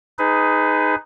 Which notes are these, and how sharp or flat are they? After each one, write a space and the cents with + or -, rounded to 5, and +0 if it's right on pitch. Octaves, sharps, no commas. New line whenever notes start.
D#4 +0 G#4 +0 B4 +25